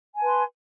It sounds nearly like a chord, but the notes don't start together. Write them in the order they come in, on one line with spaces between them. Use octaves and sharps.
G#5 A5 B4 C6